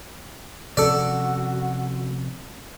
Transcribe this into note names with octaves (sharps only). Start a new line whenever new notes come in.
C3 F3 C#4 F#4 A4 D5